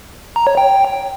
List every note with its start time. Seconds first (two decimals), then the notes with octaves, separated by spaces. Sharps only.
0.36 A#5
0.47 C#5
0.57 G5